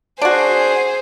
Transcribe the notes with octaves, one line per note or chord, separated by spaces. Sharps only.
D4 F#4 G#4 C5